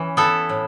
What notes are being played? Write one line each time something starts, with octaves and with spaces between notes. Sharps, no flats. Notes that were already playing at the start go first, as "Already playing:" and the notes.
Already playing: E3 C#4
B3 E4 A4
A2